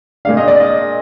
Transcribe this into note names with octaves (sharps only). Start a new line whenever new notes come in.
A#2 G#3 D4 F5
D#5
D5
D#5